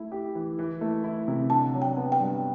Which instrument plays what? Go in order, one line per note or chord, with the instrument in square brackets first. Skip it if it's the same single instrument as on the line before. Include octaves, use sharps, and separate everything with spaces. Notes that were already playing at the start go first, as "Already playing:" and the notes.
Already playing: [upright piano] A3 E4
G4
E3
E3
A3
E4
C3
[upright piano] D3 [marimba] A5
[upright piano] F#3
[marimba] G5
[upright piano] B3
[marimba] G5
[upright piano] G2